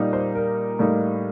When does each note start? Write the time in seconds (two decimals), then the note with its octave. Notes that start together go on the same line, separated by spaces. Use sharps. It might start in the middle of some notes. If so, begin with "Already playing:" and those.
Already playing: A#2 G3 A#3 D#4
0.13 C5
0.35 A#4
0.79 A2 G3 A#3 D#4